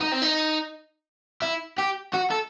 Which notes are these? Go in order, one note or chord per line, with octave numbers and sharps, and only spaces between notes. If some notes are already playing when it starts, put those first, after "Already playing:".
D#4
C4
D#4
E4
G4
F#4
A4